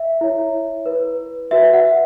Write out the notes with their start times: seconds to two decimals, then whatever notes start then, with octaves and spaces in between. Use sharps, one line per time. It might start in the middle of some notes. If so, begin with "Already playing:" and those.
Already playing: E5
0.21 E4 C#5
0.86 E4 B4
1.51 F#4 B4 E5
1.73 F#5